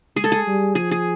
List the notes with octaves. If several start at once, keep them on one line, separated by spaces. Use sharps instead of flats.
G#3 G#4
A4
G#4
G3
F3 G#4
G#4